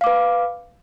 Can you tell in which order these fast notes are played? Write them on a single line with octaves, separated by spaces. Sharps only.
F5 D6 B4